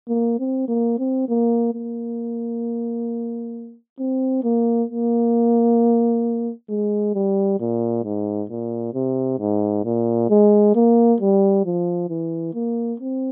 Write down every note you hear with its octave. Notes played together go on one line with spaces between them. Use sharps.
A#3
C4
A#3
C4
A#3
A#3
C4
A#3
A#3
G#3
G3
A#2
G#2
A#2
C3
G#2
A#2
G#3
A#3
G3
F3
E3
A#3
C4